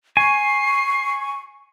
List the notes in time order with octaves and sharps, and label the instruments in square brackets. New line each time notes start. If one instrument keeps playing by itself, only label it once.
[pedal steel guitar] G#5 [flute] C#6 [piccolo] C7